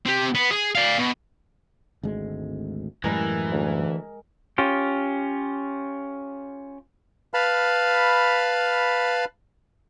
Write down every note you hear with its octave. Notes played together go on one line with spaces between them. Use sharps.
C4 G4
B3
G#4
D5 F5
B2
G#1 D2 G#3
F#2 A2 E3 G3 G#3 A#4
D2
C#4 F4 G4
B4 F5 A5 B5 F6